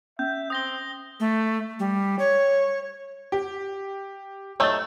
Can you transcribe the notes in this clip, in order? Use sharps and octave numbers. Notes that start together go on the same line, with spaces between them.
C#4 E5 G6
C4 D#6 A#6 G7
A3
G3
C#5
G4
F#3 A3 D#4 E6 A6